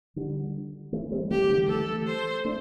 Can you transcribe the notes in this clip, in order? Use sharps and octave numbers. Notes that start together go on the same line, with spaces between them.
D3 G3
E3 A3
G3 C4
E3 A3 G4
D3 G3
E3 A3 A4
C5
A3 D4